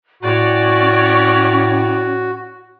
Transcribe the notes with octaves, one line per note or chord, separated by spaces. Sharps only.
A2 C#4 F#4 C#5 D5